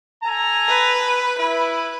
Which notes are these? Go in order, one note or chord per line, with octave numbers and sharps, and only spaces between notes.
A4 G#5 A#5
B4
E4 B4